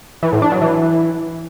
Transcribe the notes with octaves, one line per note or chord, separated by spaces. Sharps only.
E3
A2
D4
F#3
E3